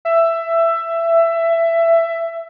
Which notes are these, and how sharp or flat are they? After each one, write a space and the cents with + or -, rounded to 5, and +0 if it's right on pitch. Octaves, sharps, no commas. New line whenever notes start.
E5 +15